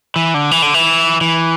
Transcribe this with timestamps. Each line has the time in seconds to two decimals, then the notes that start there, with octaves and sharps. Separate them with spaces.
0.16 E3
0.34 D3
0.51 E3
0.62 D3
0.74 E3
1.21 E3